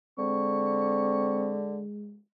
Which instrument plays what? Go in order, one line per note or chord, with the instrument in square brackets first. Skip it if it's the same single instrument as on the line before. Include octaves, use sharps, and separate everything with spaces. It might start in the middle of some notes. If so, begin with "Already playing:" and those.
[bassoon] D3 [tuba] G#3 [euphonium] C4 [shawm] C#6